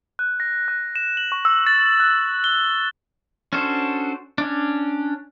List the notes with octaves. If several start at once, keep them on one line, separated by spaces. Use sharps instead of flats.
F#6
A#6
F#6
E7
F#7
C#6
E6
A6
F#6
G7
C#4 D4 F#4 A4 C5
C#4 D4